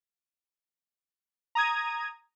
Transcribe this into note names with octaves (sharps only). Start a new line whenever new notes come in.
A#5 D#6 G#6 D#7